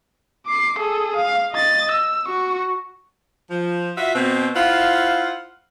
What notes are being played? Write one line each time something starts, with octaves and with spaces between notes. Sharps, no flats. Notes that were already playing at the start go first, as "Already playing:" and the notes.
D6 C7
G#4 A4
F5
D#5 A6
E6
F#4 C#6
F3
F4 F#4 E5
B2 C4
E4 F4 C5 F5 F#5